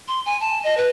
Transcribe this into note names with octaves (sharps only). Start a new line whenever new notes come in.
C6
G#5
A5
D#5
B4